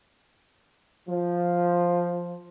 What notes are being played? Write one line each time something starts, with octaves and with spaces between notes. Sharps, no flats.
F3